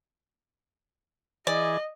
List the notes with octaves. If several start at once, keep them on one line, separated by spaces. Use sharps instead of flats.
E3 G#4 D5 D#5